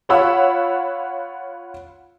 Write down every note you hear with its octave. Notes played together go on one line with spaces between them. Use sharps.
F4 C#5 F5 F#5 B5 E6